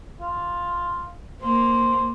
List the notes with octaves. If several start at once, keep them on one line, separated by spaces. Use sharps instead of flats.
F4
A#3 C5